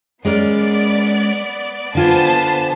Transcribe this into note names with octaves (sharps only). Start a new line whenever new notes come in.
G#3 B3 C#4 A#4 D5
D3 B3 F4 C5 G#5 A5